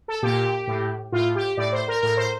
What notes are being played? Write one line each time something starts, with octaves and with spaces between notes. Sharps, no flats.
A4
A#2 G4
A2
A2 F4
G4
A2 D5
C5
A#4
A2 A#4
C5